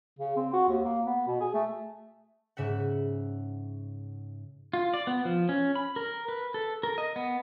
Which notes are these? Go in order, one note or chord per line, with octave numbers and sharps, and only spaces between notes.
C#3
C4
F#4
D#2
A#3
B3
B2
G#4
A3
G#2 C#3 E5 F#5
F4
D5
B3
F3
C#4
B5
A#4
B4
A4
A#4
D#5
B3